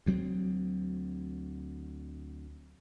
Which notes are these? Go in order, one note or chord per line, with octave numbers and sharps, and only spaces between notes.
D2 F#3 C4